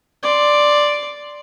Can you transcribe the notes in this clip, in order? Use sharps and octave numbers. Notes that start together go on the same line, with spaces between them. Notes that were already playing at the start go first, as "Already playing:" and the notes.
D5 C6